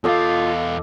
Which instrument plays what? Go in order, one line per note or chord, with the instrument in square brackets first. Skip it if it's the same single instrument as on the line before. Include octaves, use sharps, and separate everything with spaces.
[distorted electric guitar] E2 F5 [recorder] F4 [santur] A4 D#5 D6